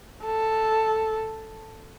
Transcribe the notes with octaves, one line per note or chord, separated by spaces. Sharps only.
A4